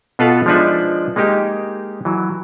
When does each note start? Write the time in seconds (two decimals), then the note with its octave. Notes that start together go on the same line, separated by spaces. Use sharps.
0.19 B2 B3 F4 A4 B4 F5
0.46 F3 G#3 D4 D#4 B4 E5
1.16 G#3 A#3 D#4 G4
2.05 E3 F#3